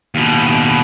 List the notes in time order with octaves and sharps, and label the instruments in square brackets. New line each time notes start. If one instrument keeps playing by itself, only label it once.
[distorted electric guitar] D#2 B2